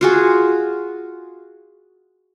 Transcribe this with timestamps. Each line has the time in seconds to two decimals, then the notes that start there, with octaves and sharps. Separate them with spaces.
0.01 F4 F#4 G#4